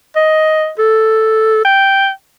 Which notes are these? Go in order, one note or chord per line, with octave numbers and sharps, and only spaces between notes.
D#5
A4
G5